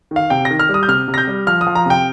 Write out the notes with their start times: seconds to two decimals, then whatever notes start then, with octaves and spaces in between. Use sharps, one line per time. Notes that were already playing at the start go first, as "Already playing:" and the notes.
0.11 D#3
0.16 F5
0.30 C3 G5
0.45 A#6
0.51 D#3
0.59 F6
0.69 G3
0.74 D#6
0.83 G6
0.88 C3 F6
1.08 C3
1.14 A#6
1.18 G6
1.27 G3
1.47 F3 F6
1.61 D#6
1.67 F3
1.75 A#5
1.86 C3 G5